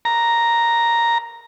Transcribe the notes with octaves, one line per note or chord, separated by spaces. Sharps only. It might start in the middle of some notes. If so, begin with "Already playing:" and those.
A#5